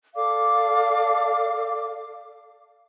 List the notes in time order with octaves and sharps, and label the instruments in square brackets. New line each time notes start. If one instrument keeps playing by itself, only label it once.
[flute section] A4 D5 F5 D6